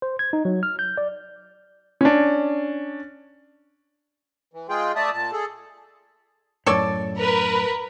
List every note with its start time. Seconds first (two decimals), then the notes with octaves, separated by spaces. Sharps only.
0.02 C5
0.19 G#6
0.33 D#4
0.45 F#3
0.63 F6
0.79 G6
0.97 D5
2.01 C#4 D4
4.53 E3
4.69 G#3 F4 G#4 G5
4.96 A3 D5 E5 A5 D#6
5.13 A#2 A5
5.33 G#4 A4
6.66 F#2 A2 A4 C#5 D5
7.19 A#4 B4